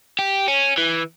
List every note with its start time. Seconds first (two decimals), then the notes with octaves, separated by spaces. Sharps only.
0.19 G4
0.48 C#4
0.78 E3